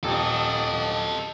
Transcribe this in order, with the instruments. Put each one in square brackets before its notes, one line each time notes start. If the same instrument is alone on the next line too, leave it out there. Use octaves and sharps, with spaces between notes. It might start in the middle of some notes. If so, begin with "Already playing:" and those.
[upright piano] D#1 [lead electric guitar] A4 D#5